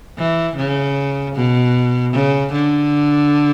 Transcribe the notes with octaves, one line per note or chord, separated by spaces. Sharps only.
E3
C#3
B2
C#3
D3